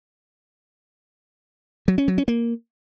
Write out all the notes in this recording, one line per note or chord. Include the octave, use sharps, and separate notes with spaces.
F#3
C#4
F#3
C#4
A#3